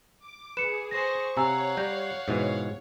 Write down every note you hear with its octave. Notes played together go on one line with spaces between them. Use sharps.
D6
G#4 B4 C#7 E7
G#4 C5 C#6 A#6
C3 C#5 F5 F#5 G#5 A#5 E6
G3 A#5 G6
G#2 B2 E3